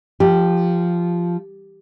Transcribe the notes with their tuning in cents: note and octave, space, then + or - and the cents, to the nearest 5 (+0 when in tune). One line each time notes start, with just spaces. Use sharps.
F3 -10 G4 +0